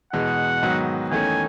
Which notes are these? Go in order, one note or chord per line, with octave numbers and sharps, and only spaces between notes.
E2 B2 G#3 F#5
G#2 D#3 F#3 B3 F#4
E2 D#3 A3 C#4 G#5